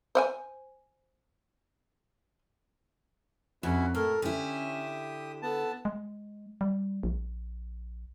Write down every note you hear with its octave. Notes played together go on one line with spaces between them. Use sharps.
C5 F#5 G#5
F2 C#4 E4 F#4
A2 A4 A#4
D3 C#4 E4 G4 D#6
B3 A4 A5
G#3
G3
A#1